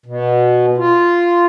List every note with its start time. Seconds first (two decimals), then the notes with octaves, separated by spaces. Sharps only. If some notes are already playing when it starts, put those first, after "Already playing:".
0.06 B2
0.77 F4